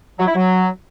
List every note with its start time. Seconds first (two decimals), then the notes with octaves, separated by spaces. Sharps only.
0.19 F#3
0.27 E4
0.35 F#3